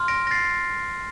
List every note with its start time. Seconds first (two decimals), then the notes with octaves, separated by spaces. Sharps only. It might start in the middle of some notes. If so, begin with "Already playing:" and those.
Already playing: C6 F6
0.08 A#6 D7
0.27 A#6
0.31 A6 C7